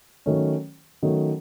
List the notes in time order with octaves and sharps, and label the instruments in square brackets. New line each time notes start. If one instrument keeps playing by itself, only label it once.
[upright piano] D#3 F#3 A3 C#4
D#3 F#3 A3 C#4